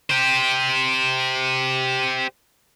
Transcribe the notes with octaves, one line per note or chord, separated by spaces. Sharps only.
G4 C5